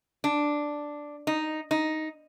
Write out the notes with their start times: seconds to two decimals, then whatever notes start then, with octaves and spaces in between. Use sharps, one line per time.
0.24 D4
1.27 D#4
1.71 D#4